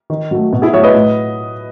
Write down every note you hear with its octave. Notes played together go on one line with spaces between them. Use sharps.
D#3
F#3 A3
B2
E4 G#4
F#3 A3 C#5 E5
B4 D#5
A2